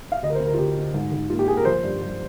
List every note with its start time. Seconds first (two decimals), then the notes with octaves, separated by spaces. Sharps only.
0.12 F5
0.22 D2 D#5
0.30 A#4
0.35 C5
0.40 D2
0.46 A#4
0.54 F4
0.58 D2 G4
0.77 D2
0.94 G#2
1.12 G#2
1.30 A#3 F4
1.39 G4
1.48 A#3 G#4
1.57 A#4
1.65 F3 C5
1.83 G2
2.02 G2